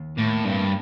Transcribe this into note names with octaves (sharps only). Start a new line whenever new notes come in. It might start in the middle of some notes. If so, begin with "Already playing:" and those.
Already playing: D#2
A2 A#3
G2 C4